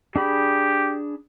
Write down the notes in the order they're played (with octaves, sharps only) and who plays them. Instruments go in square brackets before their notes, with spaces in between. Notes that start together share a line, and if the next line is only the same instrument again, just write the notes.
[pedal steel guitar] D4 G#4 B5 [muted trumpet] G4